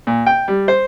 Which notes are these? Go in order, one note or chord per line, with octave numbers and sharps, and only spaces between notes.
A#2
G5
G3
C5